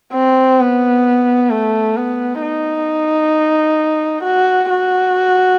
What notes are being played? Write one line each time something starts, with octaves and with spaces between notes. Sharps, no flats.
C4
B3
A3
B3
D#4
F#4
F#4